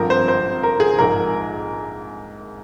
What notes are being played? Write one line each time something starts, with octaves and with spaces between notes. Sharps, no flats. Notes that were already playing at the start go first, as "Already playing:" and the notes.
Already playing: G#1 G2 F3 C4 A#4
C5
C5
A#4
G#4
A#1 G#2 F3 A#4